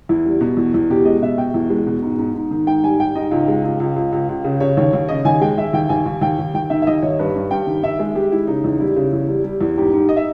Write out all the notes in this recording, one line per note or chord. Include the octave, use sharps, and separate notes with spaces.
E2 E4
G3
B2
E2
E2
B2 G4
G#3 D#5
B2 E5
B2 G5
E2
G#3
B2
G#2
G#2
G#2
D#3
G#2 G5
G3 G#5
G3 G5
G#2 D#5
C#2
G#3
C#2
C#2
C#2
C#2
C#2
C#3
C#3 C#5
D#2 C#5
D#2
C#3 D#5
D#2 G#5
G#3 G5
D#2 E5
D#2 G5
D#2 G#5
D#2
D#2 G5
D#2
D#2 G5
D#3 E5
E5
D#2 D#5
D#2 C#5
G2 B4
G2
G2 G5
D#3
D#3 E5
G#3 G#4
G#3 G4
G#3 E4
C#3 D#4
E2
G3 E4
C#3
E2
G3
G3
E2
G#2 G4
G#2
D#5
E5